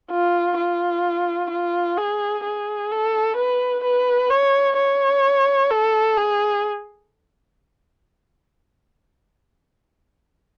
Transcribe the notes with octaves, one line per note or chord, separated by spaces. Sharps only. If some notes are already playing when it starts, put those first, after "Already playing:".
F4
F4
F4
G#4
G#4
A4
B4
B4
C#5
C#5
A4
G#4